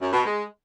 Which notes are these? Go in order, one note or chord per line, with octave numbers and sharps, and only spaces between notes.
F#2
B2
G#3